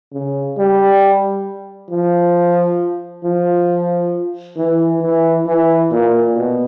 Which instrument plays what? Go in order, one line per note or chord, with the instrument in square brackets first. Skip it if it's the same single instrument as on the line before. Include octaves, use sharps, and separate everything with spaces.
[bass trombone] C#3
G3
F3
F3
E3
E3
E3
A#2
B2